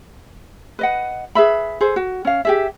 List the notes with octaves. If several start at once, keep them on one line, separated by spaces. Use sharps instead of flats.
B4 D#5 F#5
G#4 B4 E5 B5
G#4 A4 C5
F#4
C#4 F5
G4 G#4 E5